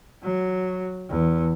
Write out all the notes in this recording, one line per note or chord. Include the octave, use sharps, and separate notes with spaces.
F#3
E2